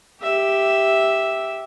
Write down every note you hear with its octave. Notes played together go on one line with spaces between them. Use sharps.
G4 E5